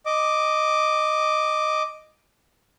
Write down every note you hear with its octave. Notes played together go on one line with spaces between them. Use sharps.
D#5 D6